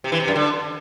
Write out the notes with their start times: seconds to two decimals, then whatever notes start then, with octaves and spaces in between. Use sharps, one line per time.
0.04 C3
0.12 E3
0.20 C3
0.28 F#2
0.36 D3